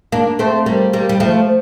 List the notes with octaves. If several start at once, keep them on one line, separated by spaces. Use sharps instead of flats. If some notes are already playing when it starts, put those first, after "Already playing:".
A#3 D4
A3 C4
G3 A#3
G3 A#3
G3
F3 A3